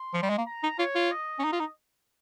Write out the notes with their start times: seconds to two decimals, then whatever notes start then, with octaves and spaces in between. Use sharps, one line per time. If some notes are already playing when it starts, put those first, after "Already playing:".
Already playing: C6
0.14 F3
0.23 G3
0.30 G#3
0.38 A#3
0.46 A#5
0.63 D#4
0.79 F4 C#5
0.95 F4
1.11 D#5
1.39 C#4
1.44 D#4
1.52 F4
1.60 D#4